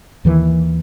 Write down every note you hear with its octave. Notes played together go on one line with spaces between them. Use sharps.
D#2 D#3 E3